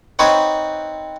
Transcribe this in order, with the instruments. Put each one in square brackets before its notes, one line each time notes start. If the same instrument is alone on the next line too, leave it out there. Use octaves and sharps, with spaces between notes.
[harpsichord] C4 D#4 B4 C#5 F#5